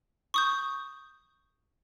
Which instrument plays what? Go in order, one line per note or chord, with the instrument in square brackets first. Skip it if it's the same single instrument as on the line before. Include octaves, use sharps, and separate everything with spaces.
[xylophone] C#6 D#6 G6